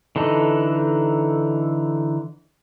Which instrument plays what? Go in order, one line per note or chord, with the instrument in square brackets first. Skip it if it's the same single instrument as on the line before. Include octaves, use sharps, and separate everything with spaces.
[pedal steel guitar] D3 E3 D#4 A4